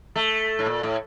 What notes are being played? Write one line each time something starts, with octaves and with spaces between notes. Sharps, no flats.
A3
A2
A#2
A2